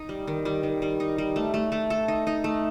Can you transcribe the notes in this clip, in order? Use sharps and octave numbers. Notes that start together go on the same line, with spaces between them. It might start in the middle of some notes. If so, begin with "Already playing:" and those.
Already playing: D#4
G3
D#3
G3
D#3
G3
D#4
G3
A3
A3
A3
A4
D#4
D#4
A3